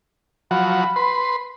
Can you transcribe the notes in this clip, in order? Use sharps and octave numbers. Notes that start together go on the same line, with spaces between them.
F3 F#3 F#4 B5
B4 C6